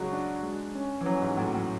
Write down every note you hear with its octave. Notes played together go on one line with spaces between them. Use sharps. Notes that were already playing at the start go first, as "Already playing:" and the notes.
Already playing: C#3 F#3 G#3 F#4
D4
G#3
C#4
E3
F#3 C#4
G#2
A2 F#3
A2